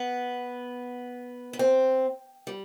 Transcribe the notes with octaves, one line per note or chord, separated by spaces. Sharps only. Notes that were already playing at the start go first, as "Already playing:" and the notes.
Already playing: B3
B3
C4
G3